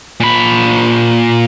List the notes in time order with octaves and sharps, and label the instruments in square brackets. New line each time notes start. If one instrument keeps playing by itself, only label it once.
[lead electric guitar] A#2 B5